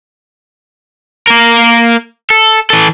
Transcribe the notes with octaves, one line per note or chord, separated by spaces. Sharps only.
A#3 A#4
A4
E3 A4